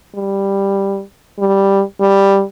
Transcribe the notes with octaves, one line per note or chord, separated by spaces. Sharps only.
G3
G3
G3